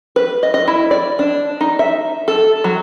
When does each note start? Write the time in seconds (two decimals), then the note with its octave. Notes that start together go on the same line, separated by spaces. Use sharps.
0.16 B4
0.43 D#5
0.54 D#5
0.68 E4
0.91 D5
1.19 D4
1.61 D#4
1.79 E5
2.28 A4
2.64 F#3